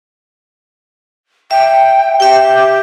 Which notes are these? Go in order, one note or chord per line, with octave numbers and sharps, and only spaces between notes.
E5 G5
G4 E5 G5